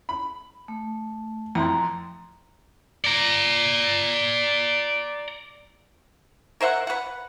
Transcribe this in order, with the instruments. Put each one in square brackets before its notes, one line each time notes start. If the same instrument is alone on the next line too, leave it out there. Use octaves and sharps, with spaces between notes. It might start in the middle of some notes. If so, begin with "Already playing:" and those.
[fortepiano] B5
[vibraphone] A3
[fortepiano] F2 A2 E3 [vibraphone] A#5 C6
[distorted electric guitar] D5 A#5
[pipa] A#4 C5 E5 F#5
B4 F#5